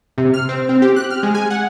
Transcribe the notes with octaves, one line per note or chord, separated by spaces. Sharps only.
C3
F6
C4
C4
G4
F#6
F6
G#3
G#5
F#5